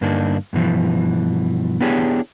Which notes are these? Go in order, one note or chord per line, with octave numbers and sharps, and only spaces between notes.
G2 D3 A#3 D4 D#4
G2 B2 E3 F3
B3 D4 E4 G4 G#4 C#5